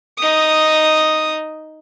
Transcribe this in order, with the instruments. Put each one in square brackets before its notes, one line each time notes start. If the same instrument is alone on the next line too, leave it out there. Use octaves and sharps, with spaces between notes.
[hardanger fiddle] D#4 D#6